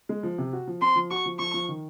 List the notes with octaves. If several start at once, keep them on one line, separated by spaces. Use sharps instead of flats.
G#3
F3
C3
F#4
F3
C4 C6
F3
F#4 C#6
F3
F3 C#6
F3
D#3